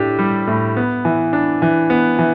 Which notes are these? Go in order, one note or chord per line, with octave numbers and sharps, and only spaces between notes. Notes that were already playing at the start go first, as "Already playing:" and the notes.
Already playing: A2 D4 G4
G3
A2
B3
E3
D4
E3
B3
E3